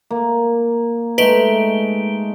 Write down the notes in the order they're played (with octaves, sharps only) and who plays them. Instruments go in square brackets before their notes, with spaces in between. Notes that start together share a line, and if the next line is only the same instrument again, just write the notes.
[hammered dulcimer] A#3
[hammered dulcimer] G#3 A3 D#4 [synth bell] B4 D7 G7